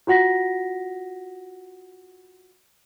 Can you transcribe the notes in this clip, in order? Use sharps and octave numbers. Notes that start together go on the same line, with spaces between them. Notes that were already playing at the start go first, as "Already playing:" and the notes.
F4 F#4 F#5 A#6 B6